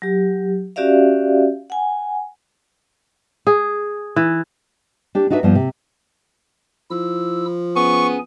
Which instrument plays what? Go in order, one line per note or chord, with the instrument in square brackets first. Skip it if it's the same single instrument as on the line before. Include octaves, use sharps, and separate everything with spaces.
[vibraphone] F#3 G4
C#4 F#4 G4 D5 E5 F5
F#5 G#5
[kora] G#4
E3
[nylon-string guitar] D4 G4
D4 D#4 F#4 B4 E5
G2 F3 B3
C3
[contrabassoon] F3 [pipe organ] E4 E6
[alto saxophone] B3 [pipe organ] C#4 G#4 G#5 [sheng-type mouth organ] C#6